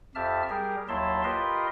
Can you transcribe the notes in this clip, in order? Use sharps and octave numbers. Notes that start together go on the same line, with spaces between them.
F2 G4 E5 A5 F6
G3 G4 G#4 A#4
D#2 F#3 E4 E5 A5 C6
F4 G4 A#4 B4 D#5 C6